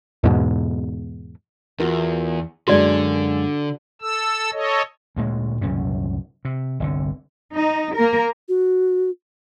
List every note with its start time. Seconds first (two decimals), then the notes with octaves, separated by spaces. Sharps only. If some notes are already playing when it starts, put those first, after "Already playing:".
0.24 E2 G#2 B2
1.80 E2 F4 F#4 A#4
2.68 F#2 D3 G#3 A#3 F#4 D5
4.02 A4 E6
4.53 A4 C#5 D#5
5.16 D2 A#2 G#3
5.61 C2 F#2 A#2 C#3
6.45 C3
6.80 G1 C2 D3
7.54 D#4
7.95 A#3 A#4
8.49 F#4